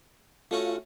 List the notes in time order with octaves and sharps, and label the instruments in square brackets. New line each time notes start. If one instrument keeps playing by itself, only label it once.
[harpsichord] A3 C#4 F#4 [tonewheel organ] F4